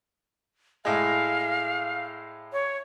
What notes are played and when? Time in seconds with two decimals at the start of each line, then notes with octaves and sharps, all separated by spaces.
0.85 A2 G#3 F5
2.52 C#5